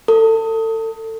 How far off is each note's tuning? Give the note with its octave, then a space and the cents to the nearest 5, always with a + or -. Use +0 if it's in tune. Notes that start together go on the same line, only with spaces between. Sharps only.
A4 +30